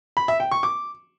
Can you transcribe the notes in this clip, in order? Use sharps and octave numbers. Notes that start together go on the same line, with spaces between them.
B5
E5
G5
C#6
D6